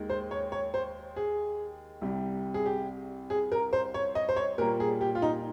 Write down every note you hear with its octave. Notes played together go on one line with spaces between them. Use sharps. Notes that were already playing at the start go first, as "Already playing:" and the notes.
Already playing: D#2 D#3 G#3
C5
C#5
C#5
C5
G#4
C2 C3 G3
G#4
G4
G#4
A#4
C5
C#5
D#5
C5
C#5
A#2 G3 A#3 A#4
G#4
G4
F4
D#4